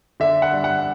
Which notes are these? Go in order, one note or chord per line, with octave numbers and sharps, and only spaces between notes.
D3 E5
F#5
G2
F#5